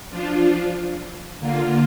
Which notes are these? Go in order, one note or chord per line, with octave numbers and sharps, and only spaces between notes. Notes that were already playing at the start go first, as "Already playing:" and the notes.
F3 D4 F4
D3 A#3 F4